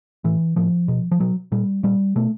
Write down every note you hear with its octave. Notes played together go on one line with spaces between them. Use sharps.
A2 E3
A2 F3
B2
F3
B2 F#3
A#2 G3
A#2 G3
B2 A3